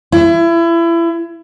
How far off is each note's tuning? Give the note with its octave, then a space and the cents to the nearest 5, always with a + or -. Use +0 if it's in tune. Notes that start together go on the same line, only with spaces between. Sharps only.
E4 +30